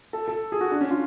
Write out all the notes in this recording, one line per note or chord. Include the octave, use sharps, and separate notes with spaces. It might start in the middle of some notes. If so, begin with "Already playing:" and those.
A4
A4
G#4
F#4
D4
C#4
F4